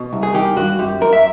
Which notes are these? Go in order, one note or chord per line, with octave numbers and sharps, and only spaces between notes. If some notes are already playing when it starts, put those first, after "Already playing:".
Already playing: B2
C2
G#4
D#3 G4
G2 F#4
F#2 G4
F#2 A#4
E5